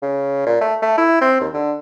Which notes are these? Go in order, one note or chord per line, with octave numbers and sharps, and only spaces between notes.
C#3
A#2
A3
A3
E4
C4
D#2
D3